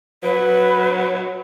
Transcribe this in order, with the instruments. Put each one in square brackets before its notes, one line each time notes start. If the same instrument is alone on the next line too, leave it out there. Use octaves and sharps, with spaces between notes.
[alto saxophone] F#3 [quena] B4